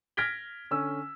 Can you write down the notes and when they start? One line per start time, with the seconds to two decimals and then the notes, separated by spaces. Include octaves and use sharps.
0.17 F6 G#6 A#6 B6 D7 G7
0.71 D3 C#4 E6